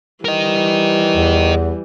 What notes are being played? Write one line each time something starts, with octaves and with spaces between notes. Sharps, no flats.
E3 G3 A#4 D#5
E2